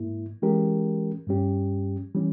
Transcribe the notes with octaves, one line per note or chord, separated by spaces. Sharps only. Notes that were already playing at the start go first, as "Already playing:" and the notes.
Already playing: G#2 A#3 E4
E3 G#3 C#4 G4 A#4
G2 G3 C#4 G4
E3 G3 C#4